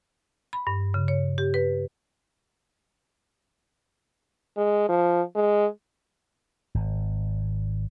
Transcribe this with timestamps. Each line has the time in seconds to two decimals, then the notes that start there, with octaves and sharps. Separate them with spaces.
0.53 B5
0.67 G2
0.94 C#3
1.08 C#5
1.38 G4
1.54 B4
4.57 G#3
4.88 F3
5.35 G#3
6.75 G#1